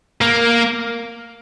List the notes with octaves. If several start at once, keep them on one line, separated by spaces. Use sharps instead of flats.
A#3